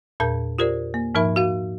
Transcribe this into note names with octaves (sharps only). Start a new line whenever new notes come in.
E2 A#2 A#4 A5 G6
F4 G4 A#4 C5 D5
A#3
G#2 F3 D#4 A#4 E5 B5
F#4 F5